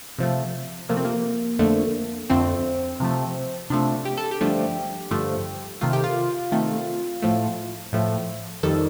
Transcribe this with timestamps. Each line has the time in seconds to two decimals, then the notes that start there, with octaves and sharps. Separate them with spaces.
0.19 C3 F3 A3
0.89 C3 F3 A3 A#3
0.97 C4
1.05 A#3
1.59 F2 D3 F3 A3
2.30 F2 D3 F3 A3 C4
3.00 C3 F3 A3
3.70 C3 F3 A3 D4
4.05 G4
4.17 A4
4.31 G4
4.41 G2 D3 F3 A3
5.11 G2 D3 F3 A3
5.81 C3 D#3 A3 F4
5.93 G4
6.04 F4
6.52 C3 D#3 A3
7.22 A2 F3 A3
7.93 A2 F3 A3
8.63 F2 D#3 G3 A4